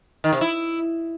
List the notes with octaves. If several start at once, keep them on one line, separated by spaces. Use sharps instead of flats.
D#3
C3
E4